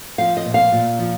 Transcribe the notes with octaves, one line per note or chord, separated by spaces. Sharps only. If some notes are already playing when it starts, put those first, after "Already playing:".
F3 F5
D#5
A#2
F5
A#2
F3